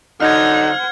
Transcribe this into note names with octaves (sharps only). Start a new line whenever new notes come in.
D3 F#3 D#4 C5 F#5 F6 G#6